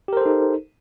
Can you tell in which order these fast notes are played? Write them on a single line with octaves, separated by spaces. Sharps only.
G4 A#4 C5 A4 D#4